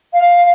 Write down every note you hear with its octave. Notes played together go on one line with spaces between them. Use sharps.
F5